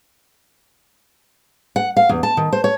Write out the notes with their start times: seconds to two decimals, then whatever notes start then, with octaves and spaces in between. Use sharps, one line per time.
1.76 F#5
1.97 F5
2.09 E2
2.23 A5
2.37 D#3
2.52 C5
2.64 C#5